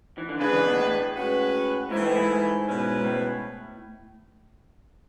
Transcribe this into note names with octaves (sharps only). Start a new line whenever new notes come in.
E3
D3
C#3 G#3 D4 G#4 B4
E3
B2
A2
G#3 C#4 F#4 B4
G#2 E3 A3 E4
A2
G#2
B2 G#3 C#4 E4 B4
G#2
A2